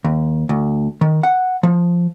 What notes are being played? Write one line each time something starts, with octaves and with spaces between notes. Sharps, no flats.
D#2
D2
D#3
F#5
F3